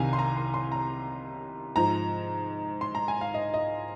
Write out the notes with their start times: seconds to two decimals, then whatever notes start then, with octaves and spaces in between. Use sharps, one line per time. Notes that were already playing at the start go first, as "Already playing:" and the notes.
Already playing: C2 C3 D#3 F5 G#5 A#5
0.13 C6
0.19 A#5
0.37 C6
0.54 C6
0.72 A#5
1.76 G#2 F3 A#5
2.81 C6
2.95 A#5
3.08 G#5
3.21 F5
3.34 D#5
3.54 D#5